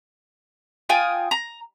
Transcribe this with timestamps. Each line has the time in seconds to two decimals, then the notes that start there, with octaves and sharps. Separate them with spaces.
0.89 F4 G5 G#5 D#6
1.31 A#5